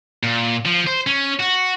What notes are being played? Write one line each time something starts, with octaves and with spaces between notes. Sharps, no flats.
A#2
F3
C5
C#4
F#4